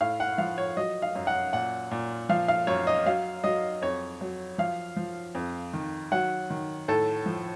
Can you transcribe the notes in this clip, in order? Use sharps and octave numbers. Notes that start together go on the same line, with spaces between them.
A2 F5
F#5
F3 F5
C#5
F#3 D#5
F5
F#2
F#5
A#2 F#5
A#2
F3 F5
F5
F#2 C#5
D#5
F#3 F5
F#3 D#5
F2 C#5
F#3
F3 F5
F3
F2
D#3
F#3 F#5
D#3
A2 A4
F3